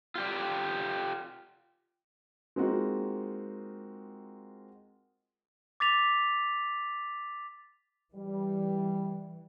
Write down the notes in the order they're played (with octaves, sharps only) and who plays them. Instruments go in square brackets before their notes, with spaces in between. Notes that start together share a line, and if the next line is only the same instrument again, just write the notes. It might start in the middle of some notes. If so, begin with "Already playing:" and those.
[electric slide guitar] F4 G4 D5
[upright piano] G#3 A#3 C4 D#4 F4 F#4
[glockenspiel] D6 A6 B6 F7
[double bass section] E3 [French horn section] G3